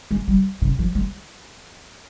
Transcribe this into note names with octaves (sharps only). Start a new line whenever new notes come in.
G#3
G3
C#3
F3
G#3